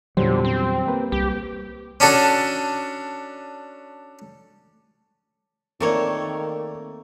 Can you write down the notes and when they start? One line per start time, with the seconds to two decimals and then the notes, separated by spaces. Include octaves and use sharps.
0.17 E2 A#2 D3 F#3 G3 G4 C5
0.45 C4
0.87 A#3 B4
1.12 C2 G4
2.00 C#4 D4 F#4 A4
5.80 D#3 A3 A#3 C4 C#5 D5